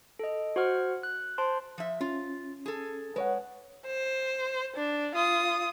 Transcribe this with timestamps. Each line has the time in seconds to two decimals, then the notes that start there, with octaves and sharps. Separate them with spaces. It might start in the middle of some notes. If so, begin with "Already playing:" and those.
0.19 A4 D#5
0.56 F#4 C5 F#5 C#6 F6
1.03 F#6
1.38 C5 A5 C6
1.78 F3 E5
2.01 C#4 F4
2.66 G#4 A4
3.16 G#3 B4 C#5 F#5
3.86 C5
4.76 D4
5.15 F4 D#6